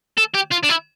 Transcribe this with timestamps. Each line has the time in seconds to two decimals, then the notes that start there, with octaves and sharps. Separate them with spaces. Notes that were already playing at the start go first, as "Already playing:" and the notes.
0.18 A4
0.35 G4
0.52 F4
0.64 D4
0.70 E4